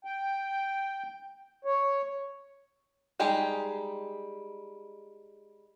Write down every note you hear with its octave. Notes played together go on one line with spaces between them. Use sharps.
G5
C#5
G3 G#3 D#4 G4 G#4